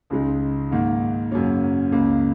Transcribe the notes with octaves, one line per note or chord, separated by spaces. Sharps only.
C#2 C#3 G#3 D#4
G#2 D#3 A#3
F#2 C#3 A#3 C#4
C#2 C#3 A#3